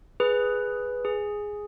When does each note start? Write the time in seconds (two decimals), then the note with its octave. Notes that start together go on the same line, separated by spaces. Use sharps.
0.20 G#4 B4
1.05 G#4